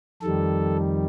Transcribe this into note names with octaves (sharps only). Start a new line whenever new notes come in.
F2 D#3 G3 A4